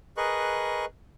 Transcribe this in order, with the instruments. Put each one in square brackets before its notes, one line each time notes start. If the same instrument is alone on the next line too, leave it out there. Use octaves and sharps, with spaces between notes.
[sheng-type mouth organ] G#4 A#4 B4 D#5 C#6 F#6